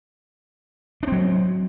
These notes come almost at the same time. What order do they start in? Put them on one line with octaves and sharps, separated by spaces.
D4 C4 F#3